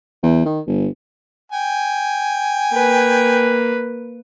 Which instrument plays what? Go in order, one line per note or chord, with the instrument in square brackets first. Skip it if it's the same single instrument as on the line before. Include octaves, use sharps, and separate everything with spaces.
[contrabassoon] E2
D#3
G1
[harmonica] G5 G#5
[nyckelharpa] A#3 B4